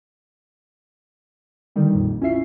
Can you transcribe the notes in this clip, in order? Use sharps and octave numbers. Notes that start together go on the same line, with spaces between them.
D3 D#3 G3 D#4
A#1 F2 A#2
C#4 E4 F4 E5 C7